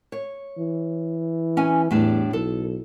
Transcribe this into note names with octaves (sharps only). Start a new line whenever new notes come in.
C#5
E3
C#4 G#5
E2 A2 G3 D4
B1 A4